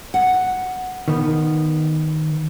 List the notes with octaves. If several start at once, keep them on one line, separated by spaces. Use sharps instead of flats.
F#5
D#3 B3